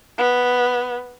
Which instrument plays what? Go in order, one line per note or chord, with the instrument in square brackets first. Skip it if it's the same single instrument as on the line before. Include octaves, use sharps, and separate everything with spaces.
[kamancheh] B3